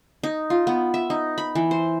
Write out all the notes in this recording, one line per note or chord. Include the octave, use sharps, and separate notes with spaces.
D#4
F4
B3
E5
D#4
B5
E3
C5